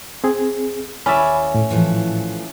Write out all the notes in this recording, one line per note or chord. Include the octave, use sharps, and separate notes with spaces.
C4 G#4
D#2 C#4 E4 D5 E5 G#5 B5
A2
E3 F3 A3